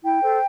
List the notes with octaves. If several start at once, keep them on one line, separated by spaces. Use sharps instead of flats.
E4 G5
A4 C5